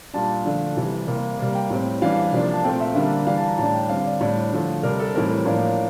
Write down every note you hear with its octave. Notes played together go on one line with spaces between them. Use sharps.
A#2 G3 D4 A5
D3 F3 A3 D4
C3 E3 G3
C3 G3 A#3
C3 G3 A#3
G5
A2 G3 C4
E3 G3 D4 F5
C3 F3 A#3 D4
A5
A#2 A3 C4 G5
E5
D3 G3 A#3 D4 D5
E3 G3 D4 F5
A5
A#5
A2 G3 D4 A5
G5
D3 G3 C4 F5
D5
A2 G3 D4
D3 F3 A3
C3 G3 D4 A#4
A4
A2 E3 G3 C4 A#4
A2 F3 A#3 D4